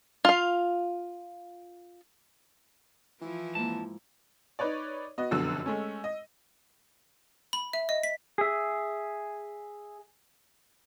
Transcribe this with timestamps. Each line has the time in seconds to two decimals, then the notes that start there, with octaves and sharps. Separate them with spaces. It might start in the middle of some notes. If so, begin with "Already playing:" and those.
0.25 F4 F5
3.22 E3 F3 E4
3.55 F2 G#2 A#3 A5
4.59 D#4 B4 C#5 D5
5.18 B3 F#4 D#5
5.31 F1 F#2 B2 D3 E6
5.66 G#3 A3 C#4
6.04 D#5
7.53 B5
7.73 E5
7.89 D#5
8.03 B6
8.38 G#4 E5